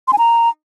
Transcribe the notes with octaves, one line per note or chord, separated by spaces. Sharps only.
C6
G#5
A#5